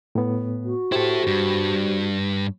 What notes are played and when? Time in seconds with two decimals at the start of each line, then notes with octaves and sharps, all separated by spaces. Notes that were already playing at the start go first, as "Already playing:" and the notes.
0.15 A2 B3
0.65 F#4
0.92 E4 G4 A4 C5
1.27 G2